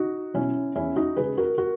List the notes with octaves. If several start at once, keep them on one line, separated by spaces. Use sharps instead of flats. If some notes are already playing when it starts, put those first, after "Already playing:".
Already playing: D#4 F#4
B2 F#3 C#4 E4
E2 C#4 E4
D#4 F#4
C#3 G#3 G#4 B4
F#4 A#4
F#4 A#4